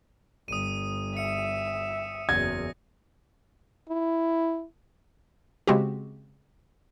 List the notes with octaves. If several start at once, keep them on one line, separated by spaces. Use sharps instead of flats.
G1 D#6 D#7
E5 C#7
F#1 E2 G#6 A#6
E4
C#3 G#3 C4 F#4 G4